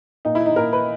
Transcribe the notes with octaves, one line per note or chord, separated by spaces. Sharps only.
A#2 D#4
E4
D#4
A#2 A#4
B4